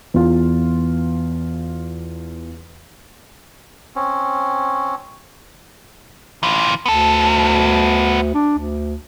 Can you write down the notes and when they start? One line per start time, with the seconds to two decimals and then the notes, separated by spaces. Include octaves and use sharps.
0.14 E2 F4
3.96 C4 C#4
6.43 E3 F4
6.86 D2 B3 A4
8.34 D4
8.58 D2